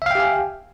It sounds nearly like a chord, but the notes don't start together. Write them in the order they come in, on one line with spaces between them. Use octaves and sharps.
E5 F5 G5 G4 G#5